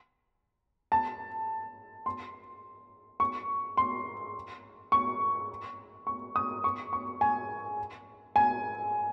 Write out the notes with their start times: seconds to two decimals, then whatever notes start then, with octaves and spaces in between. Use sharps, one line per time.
0.92 A5
2.06 C6
3.20 C#6
3.77 C6
4.92 C#6
6.07 C#6
6.36 D#6
6.64 C#6
6.93 C#6
7.21 G#5
8.36 G#5